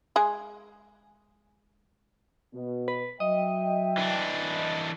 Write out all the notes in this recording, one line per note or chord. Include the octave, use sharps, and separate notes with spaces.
G#3 G#4
B2
B4
F#3 D#5 E5 G5
E3 D4